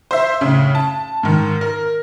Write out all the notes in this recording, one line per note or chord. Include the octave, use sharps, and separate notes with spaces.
C5 E5
A2 C#3
A5
G#2 D#3
A#4